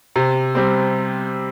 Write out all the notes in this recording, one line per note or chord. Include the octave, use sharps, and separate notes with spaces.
C3
G3 C4